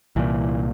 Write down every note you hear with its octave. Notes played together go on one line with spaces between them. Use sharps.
C2 A#2 E3